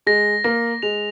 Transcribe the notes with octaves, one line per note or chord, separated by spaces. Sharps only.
G#3 A#6
A#3 A#6
G#3 F7